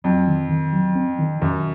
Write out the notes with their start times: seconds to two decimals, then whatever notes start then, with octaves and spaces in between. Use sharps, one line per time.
0.04 F2 F#3
0.27 D#3
0.49 D#3
0.73 F#3
0.95 C4
1.19 D#3
1.41 F#2 D#3